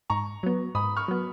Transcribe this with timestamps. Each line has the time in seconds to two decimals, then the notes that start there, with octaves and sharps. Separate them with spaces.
0.10 G#2 A#5 C#6
0.43 F#3 B3
0.75 G#2 B5 D#6
0.97 C#6 F6
1.08 F#3 B3